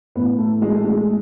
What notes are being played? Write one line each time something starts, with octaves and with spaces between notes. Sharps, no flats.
A2 E3 B3
A3
G#3
A3
G#3